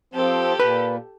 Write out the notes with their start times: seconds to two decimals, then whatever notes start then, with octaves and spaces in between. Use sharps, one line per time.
0.14 F3 C4 G4 A4
0.60 A#2 B4